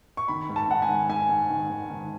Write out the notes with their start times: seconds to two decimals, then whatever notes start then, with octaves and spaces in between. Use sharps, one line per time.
0.17 C#6
0.28 D#3 B5
0.49 G#2
0.56 A5
0.69 G#2 F#5
0.82 G#5
0.89 D#3
1.09 G#2 G#5
1.29 G#2
1.50 D#3
1.70 G#2
1.90 D#3